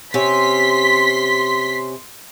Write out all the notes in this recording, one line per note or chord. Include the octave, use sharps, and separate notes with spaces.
C3 C#4 C6 B6